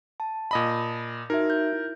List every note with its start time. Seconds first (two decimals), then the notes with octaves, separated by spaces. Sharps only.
0.20 A5
0.51 A#2 D#5 B5
1.30 D#4 F#4 A#4 E5
1.50 G6
1.73 E4